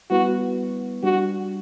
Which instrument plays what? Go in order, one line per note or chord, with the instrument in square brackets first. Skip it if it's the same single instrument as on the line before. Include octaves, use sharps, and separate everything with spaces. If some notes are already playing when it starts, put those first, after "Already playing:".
[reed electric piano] G3 B3 E4 B4 [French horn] F#4
[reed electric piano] G3 D4 G4 [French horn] F#4